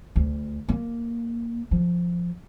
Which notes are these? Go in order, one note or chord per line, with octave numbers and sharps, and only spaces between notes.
D2
A#3
F3